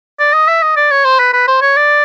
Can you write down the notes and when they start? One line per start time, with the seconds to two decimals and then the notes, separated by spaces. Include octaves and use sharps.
0.19 D5
0.33 D#5
0.48 E5
0.62 D#5
0.76 D5
0.91 C#5
1.05 C5
1.19 B4
1.33 B4
1.48 C5
1.61 C#5
1.76 D5